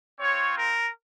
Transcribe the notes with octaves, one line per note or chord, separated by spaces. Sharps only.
C4 F4 C#5
A#4